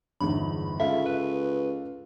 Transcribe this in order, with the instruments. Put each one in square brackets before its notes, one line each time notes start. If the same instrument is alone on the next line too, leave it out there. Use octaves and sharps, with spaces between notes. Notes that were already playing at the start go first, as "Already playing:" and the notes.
[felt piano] G1 E2 G#2 [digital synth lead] B5
[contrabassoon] C#2 [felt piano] A4 F5 [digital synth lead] E5
[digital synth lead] B4